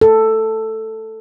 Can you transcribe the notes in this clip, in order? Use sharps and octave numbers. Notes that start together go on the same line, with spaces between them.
A4